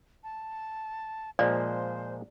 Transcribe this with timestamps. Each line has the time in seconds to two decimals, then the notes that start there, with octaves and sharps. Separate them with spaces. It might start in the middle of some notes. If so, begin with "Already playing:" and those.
0.24 A5
1.39 A#2 F3 G#3 C5 D5